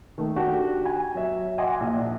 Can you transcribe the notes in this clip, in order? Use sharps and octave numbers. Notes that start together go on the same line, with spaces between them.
D#3 A3
D4 F#4 G4
G#5
F#3 E5
D#5 E5 F#5 G#5 C6 D6
A#1 A#2